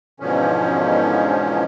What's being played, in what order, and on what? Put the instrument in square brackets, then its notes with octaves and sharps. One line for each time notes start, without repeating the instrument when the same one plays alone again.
[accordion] E2 G#2 B2 D3 F3 C#4